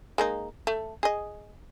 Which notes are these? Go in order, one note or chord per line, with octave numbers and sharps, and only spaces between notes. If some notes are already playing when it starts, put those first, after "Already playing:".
G#3 A#3 D#4
A3
G#4 D#5